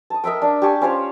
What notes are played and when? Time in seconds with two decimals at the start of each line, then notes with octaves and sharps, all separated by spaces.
0.10 A5 D#6
0.24 A#4 D#5 E5 G5
0.42 D4 F5
0.62 G4 G#5 A5 C#6
0.82 C#4 F4 C5 C#5